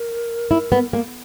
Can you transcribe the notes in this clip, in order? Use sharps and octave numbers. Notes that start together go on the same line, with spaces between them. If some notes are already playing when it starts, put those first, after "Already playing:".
Already playing: A#4
E4
B3
A#3